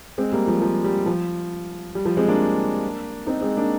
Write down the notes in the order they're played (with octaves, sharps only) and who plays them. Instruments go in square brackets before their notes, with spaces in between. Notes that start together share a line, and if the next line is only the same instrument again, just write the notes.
[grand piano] G#3 C4
G3 A#3
F3 G#3
F3
G3
F3
G3
F3
G#3 C4
A#3 D4
C4 D#4
G#3 C4
A#3 D4